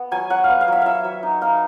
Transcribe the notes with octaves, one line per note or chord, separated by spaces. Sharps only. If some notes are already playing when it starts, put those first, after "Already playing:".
Already playing: B3
F#3 G#5
F#3 F#5
B3 F5
F5
F#3 E5
F#3 E5 F5
F#3
D#4
D#4 F5